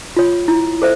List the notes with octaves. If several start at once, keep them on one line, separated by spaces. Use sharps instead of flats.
F4 C#5
E4
A4 C5 E5